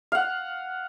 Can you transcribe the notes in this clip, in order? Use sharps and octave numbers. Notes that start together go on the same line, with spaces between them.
F5 F#5